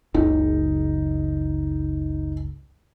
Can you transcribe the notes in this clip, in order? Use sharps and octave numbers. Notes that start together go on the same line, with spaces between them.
F#1 C#2 D#4